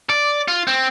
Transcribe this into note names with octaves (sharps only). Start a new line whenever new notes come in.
D5
F4
C4